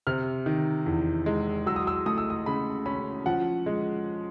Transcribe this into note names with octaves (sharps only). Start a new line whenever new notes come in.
C3 F6
D#3
E2
G#3
F#3 E6
D#6
E6
A3 D#6
E6
D#6
C#3 B5
C#4 B5
F3 F#5
G#3